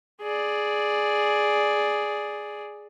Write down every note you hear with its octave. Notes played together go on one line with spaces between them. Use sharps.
G#4 D5